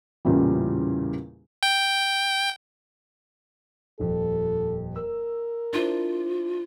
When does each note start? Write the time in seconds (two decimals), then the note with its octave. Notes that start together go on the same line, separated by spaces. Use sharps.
0.25 A1 E2 A#2 C#3 E3 G3
1.63 G5
4.00 D#1 F2 A4
4.96 A#4 E6
5.73 D4 E4 F4 C5